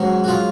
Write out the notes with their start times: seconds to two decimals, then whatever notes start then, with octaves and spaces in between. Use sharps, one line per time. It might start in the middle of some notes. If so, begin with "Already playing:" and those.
Already playing: G#2 F#3 C#4
0.24 F#4
0.28 F4 G#4